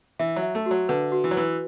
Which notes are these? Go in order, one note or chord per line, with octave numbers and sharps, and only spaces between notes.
E3 E5
F#3
E5
A3
F#4
F#3
D3 B4
F#4
E3
F#3
E3 B4